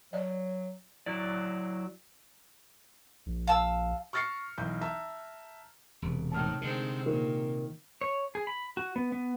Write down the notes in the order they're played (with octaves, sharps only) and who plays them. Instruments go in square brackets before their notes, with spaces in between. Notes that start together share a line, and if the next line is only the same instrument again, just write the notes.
[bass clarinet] F#3 [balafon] D5 D#5
[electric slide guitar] F#3 E4 D5
[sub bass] A#1
[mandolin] F5 A5 E6
[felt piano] C#6 F6 A6 A#6 C7 C#7
B1 E3 G6
E5 A5 A#5
[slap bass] E1 [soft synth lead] C3
[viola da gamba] A2 D#3 [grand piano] A5 F6
[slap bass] D3 [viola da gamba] D#3 G#3 C4
[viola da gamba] A#2 [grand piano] D#3
[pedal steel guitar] C#5
G#4
B5
F#4
B3
B3